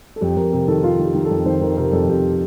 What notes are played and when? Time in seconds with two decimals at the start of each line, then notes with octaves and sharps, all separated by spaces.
0.16 A4
0.21 F2 G4
0.36 F2 A#4
0.53 C3 A#4
0.68 D#3 A4
0.84 D#3 F4
0.99 D#3
1.05 G4
1.14 D#3
1.25 A4
1.31 F2
1.46 D#3 C5
1.61 D#3 A#4
1.77 C3 A#4
1.92 F2 A4
2.08 F2 G4